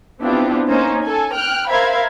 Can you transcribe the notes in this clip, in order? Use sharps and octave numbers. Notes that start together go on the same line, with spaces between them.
B3 C4 D4 E4 F4 G4
A#3 C#4 D#4 C5
A4 G#5
G5 F6 F#6
A#4 C5 E5 F5 B5 G#6